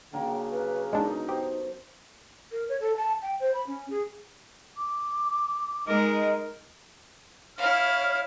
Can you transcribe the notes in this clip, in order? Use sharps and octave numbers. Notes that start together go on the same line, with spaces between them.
C#3 F#3 A#3 D4 G5
B4
F#2 B2 G#3 D4 D#4
G4 C5
A#4
C#5
A4
A5
G5
C5
B5
C#4
G#4
D6
G#3 D#4 A#4
E4 C#5 F5 F6